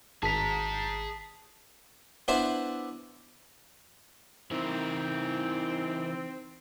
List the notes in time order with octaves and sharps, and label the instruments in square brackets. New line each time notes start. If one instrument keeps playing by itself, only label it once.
[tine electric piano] G#1 [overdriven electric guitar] G#4 A#5 [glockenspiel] A5 B6
[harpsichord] B3 D4 E4 C5 E5 F#5
[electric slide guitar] E3 E4 A#4 [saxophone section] C4 [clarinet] D#4